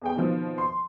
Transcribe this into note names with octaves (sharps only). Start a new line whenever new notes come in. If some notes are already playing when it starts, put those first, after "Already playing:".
E2 G#4 G5
B2 D#3 F3 C4
C6